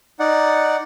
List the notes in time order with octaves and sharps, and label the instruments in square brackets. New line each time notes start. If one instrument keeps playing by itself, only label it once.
[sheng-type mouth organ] D#4 D5 F#5